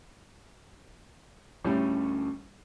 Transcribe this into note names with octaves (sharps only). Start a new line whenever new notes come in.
D2 A2 G3 C#4